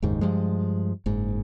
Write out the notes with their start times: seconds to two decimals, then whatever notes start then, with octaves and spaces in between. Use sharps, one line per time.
0.02 F#1 D#2 G#2 D#3
0.21 G2 F3 G#3
1.06 F#1 G#2